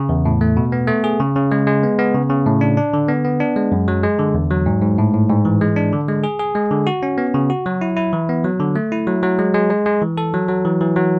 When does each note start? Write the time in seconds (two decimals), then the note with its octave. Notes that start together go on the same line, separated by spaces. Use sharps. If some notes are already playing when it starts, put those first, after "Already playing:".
Already playing: C#3
0.09 E2
0.25 A2
0.41 A3
0.57 B2
0.72 B3
0.88 A3
1.04 G#4
1.20 C#3
1.36 C#3
1.51 G#3
1.67 G#3
1.83 B3
1.99 B3
2.14 C#3
2.30 C#3
2.46 A2
2.61 D4
2.77 D4
2.93 D3
3.09 B3
3.25 B3
3.40 D4
3.56 G#3
3.72 F#2
3.88 F#3
4.03 G#3
4.19 D3
4.34 E2
4.51 F#3
4.66 G#2
4.82 G#2
4.98 A2
5.14 A2
5.30 G#2
5.45 E3
5.61 G#3
5.76 D4
5.93 D3
6.08 G#3
6.24 G#4
6.39 G#4
6.55 G#3
6.71 D3
6.87 F#4
7.03 C#4
7.18 B3
7.34 C#3
7.50 F#4
7.66 F#3
7.81 E4
7.97 E4
8.13 E3
8.29 B3
8.44 F#3
8.60 D3
8.76 A3
8.92 E4
9.07 F#3
9.23 F#3
9.39 G#3
9.54 G#3
9.70 G#3
9.86 G#3
10.02 E3
10.18 A4
10.34 F#3
10.49 F#3
10.65 E3
10.81 E3
10.96 F#3